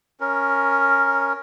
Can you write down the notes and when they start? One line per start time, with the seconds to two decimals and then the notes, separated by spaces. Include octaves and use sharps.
0.20 C#4 A#4